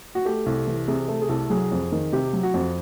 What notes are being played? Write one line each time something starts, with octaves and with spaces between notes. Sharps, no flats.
F#4
A3 G4
C2
E3
C3 G#4
A3
G#4
C2 A4
F#3 G#4
F2
D#3
C3 G4
F#3
F#4
F2